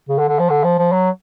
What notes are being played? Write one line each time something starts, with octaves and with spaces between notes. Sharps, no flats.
C#3
D3
D3
F3
D3
F3
F3
F#3